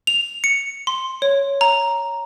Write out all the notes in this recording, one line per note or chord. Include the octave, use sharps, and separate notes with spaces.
F7
C#7
C6
C#5
A#5